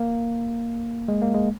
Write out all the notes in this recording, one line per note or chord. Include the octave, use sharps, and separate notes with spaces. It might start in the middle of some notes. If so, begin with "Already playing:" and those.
Already playing: A#3
G#3
A#3
G#3